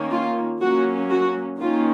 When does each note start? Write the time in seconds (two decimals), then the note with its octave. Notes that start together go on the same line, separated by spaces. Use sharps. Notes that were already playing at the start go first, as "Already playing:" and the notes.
Already playing: D#3 A#3 C#4
0.11 F4
0.61 F#3 A#3 C#4 F#4
1.10 F#4
1.60 D#3 A#3 C#4 F4